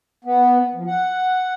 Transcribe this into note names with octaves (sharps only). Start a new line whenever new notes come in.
B3
F3
F#5